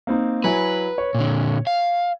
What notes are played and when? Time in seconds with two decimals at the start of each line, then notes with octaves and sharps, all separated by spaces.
0.07 A#3 C4 D#4
0.44 F#3 E4 B4 G#5
0.98 C#5
1.14 A#2 D3
1.67 F5